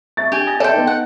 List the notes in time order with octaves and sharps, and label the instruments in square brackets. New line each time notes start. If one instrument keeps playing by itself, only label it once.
[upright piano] E5 C#6 A6
[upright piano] D4 [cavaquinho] G4 G#5
[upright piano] D#6 A6 A#6
[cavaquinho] A4 G5 [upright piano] D5 E5 C6
[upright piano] B3 D#4
[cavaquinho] F#5